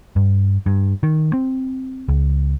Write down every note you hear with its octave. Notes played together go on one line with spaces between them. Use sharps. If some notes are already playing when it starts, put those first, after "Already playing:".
G2
G2
D#3
C4
C#2